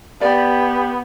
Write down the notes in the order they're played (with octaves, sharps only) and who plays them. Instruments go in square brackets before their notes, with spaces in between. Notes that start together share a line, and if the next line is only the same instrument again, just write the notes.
[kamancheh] B3 [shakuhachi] G4 [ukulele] D5